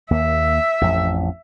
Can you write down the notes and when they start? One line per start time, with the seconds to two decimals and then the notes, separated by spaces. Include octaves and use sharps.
0.11 D#2 A#3 E5
0.81 A1 F2